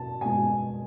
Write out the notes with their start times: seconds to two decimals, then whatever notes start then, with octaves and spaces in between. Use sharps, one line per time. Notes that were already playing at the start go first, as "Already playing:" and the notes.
Already playing: B2 A5
0.21 B2 G#3 G#5